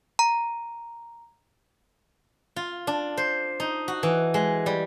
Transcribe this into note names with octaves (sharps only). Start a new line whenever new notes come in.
A#5
F4
D4
C5
D#4
F#4
E3
G#3
G3